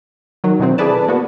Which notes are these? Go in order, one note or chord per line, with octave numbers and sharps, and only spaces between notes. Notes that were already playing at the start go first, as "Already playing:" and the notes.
D#3 F#3
B2 D#3 E3 F#3 C4
E4 G#4 A4 B4 D5 A5
A#3 B3 F#4